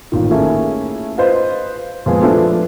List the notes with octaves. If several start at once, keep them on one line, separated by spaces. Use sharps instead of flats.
A1 A#2 D#3
A3 A#3 C#4 E4 F4 G#4
F4 B4 C5 D#5
A#2 F3 G#3 B3 G#4
F3 A3 B3 D4 E4 A4